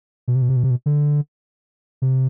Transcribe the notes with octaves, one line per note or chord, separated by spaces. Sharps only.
B2
C3
B2
C3
B2
C3
B2
D3
C3